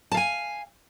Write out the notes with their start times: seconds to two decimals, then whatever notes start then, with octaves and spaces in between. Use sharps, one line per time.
0.12 A5
0.14 F5
0.17 G#5